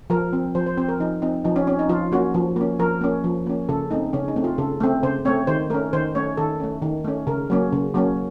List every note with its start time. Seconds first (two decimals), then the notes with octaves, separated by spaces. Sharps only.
0.10 F3 A#4
0.33 C4
0.55 F3 C5
0.66 C5
0.77 C4 C5
0.89 A#4
1.00 F3 D#4
1.22 C4 D#4
1.45 F3 D#4
1.56 C#4
1.67 C4 C#4
1.79 D#4
1.89 F3 F4
2.12 A#3 C#4 F#4
2.34 F3
2.56 A#3 C#4
2.79 F3 A#4
3.01 A#3 C#4
3.24 F3
3.46 A#3 C#4
3.69 C#3 A4
3.91 A3 C4 D#4
4.13 C#3 C#4
4.28 D#4
4.36 A3 C4
4.44 F4
4.58 C#3 A4
4.80 A3 C4
5.03 C#3 C5
5.25 A3 C4 C#5
5.47 D#3 C5
5.70 A3 C#4 A#4
5.93 D#3 C5
6.15 A3 C#4 C#5
6.37 D#3 A4
6.60 A3 C#4
6.82 D#3
7.04 A3 C#4
7.27 C#3 A#4
7.50 F#3 A#3 C#4
7.73 C#3
7.95 F#3 A#3 C#4